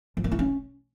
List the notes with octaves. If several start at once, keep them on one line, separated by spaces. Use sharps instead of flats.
F3
A#3
E4
C#4